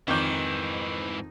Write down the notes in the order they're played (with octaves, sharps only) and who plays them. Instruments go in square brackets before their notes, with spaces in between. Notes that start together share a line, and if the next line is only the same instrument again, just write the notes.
[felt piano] F2 D6 G6 [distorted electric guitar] G#2 E3 [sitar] D#3